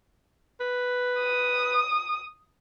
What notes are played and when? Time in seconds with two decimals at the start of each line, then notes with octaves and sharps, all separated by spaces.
0.60 B4
1.19 D#6